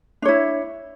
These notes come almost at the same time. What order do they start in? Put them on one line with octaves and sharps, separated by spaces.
D4 C#5 E4